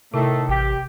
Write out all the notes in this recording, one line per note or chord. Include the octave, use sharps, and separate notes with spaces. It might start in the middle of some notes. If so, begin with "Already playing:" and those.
A2 C3 D#3 A3
A1 G4